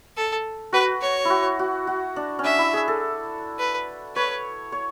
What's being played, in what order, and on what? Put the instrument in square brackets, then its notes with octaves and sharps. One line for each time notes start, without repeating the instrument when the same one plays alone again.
[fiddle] A4
[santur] F#4 [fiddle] B4
[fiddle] C#5
[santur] E4 F#4
F#4
F#4
D4
C#4
[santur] D4 [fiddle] E5
[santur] E4
G#4
A4
[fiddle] B4
[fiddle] B4 [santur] C#5
[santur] C#5